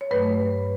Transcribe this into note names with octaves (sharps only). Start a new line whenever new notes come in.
C#5
G2 F#3 A3 B4